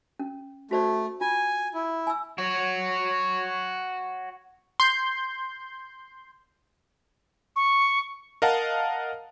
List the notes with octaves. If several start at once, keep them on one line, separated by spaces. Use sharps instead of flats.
C#4
A3 F#4 C5 D5
F4 G#5
E4
G#5 E6
F#4 C#5
C6 G6
C#6
A#4 D#5 F5 F#5 A5